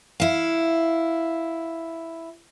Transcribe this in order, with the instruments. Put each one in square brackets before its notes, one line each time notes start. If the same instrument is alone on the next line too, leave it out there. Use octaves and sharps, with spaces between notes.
[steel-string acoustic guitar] E4 F5